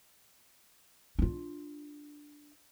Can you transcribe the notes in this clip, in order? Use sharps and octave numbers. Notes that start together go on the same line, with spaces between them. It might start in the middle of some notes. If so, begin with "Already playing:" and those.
D4 F4